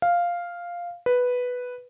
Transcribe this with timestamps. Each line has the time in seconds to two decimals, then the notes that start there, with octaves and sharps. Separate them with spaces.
0.02 F5
1.06 B4